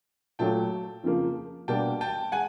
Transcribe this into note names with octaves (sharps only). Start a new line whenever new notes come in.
A#2 F#3 A3 G5 A5
F2 C#3 F3 A#3
B2 G3 A#3 D4 G5 A5
G5 A5
G#3 F#5 G#5